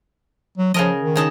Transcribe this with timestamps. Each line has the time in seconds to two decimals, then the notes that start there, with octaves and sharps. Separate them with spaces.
0.58 F#3
0.74 C#3 F3 A#4 D#5
1.00 D#3
1.16 C#3 D#4 A5